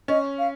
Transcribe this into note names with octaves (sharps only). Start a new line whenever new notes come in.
C#4 D#5
F5